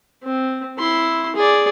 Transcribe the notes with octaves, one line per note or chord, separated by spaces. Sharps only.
C4
E4 C6
G#4 D5